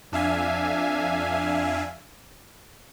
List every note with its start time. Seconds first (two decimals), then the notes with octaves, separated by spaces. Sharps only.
0.12 F2 D4 E5 F5 G#5